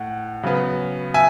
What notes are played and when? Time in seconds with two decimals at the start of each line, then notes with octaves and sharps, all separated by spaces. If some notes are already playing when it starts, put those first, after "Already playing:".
Already playing: A2 F#5
0.43 C#3 F#3 B3
1.14 E5 G#5